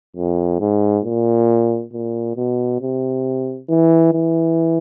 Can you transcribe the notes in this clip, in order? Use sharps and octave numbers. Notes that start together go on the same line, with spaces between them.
F2
G#2
A#2
A#2
B2
C3
E3
E3